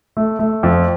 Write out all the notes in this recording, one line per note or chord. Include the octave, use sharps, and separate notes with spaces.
A3
A3
F2